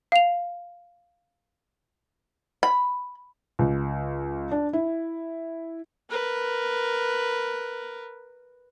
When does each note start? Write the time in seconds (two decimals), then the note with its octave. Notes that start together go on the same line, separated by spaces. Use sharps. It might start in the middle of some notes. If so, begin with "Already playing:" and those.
0.12 F5 F7
2.63 B5
3.59 C#2
4.51 D4
4.73 E4
6.10 A#4 B4